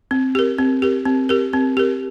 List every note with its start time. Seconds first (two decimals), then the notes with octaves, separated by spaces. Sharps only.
0.11 C4
0.35 G4 A#4
0.58 C4
0.82 G4 A#4
1.05 C4
1.29 G4 A#4
1.53 C4
1.77 G4 A#4